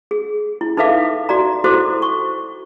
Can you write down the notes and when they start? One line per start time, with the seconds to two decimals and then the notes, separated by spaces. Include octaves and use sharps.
0.11 G#4
0.61 E4
0.77 D#4 A4 B4 E5 F5 D6
1.29 F#4 D5 A#5
1.64 E4 F#4 A4 C5 D6
2.02 C#6